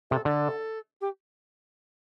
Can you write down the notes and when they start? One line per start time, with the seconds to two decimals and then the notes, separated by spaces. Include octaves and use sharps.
0.11 C3 A4
0.25 D3 A4
1.01 G4